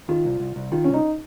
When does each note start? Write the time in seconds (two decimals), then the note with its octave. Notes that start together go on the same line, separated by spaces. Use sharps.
0.09 D#3 F4
0.25 C2
0.40 C2
0.56 C2
0.72 D#3 F4
0.84 C#4
0.88 C2
0.94 D#4